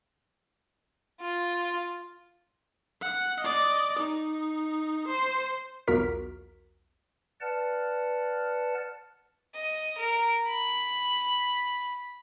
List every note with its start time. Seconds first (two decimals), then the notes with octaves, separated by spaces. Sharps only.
1.21 F4
3.02 F#5
3.40 D5 D#5
3.99 D#4
5.07 C5
5.87 B1 E2 F4 F#4 A#4 B6
7.41 B4 D5 F#5 A5 F6
9.55 D#5
9.98 A#4
10.48 B5